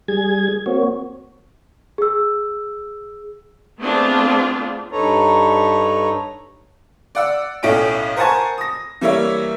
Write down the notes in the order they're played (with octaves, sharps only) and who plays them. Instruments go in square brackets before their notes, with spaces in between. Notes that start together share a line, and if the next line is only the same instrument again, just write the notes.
[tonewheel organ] G3 G#4 G#6
A#3 C4 F#4 C#5
[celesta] G#4 E6
[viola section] A3 B3 C4 D4 F4 G#4
[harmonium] G2 D#4 A4 B4 C#5 A#5
[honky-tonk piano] D5 F#5 E6
B1 A2 A3 C#4 D7
A#4 C5 F#5 G#5 A5 C#6
D#6 A#6
E3 G3 A#3 C#5 E5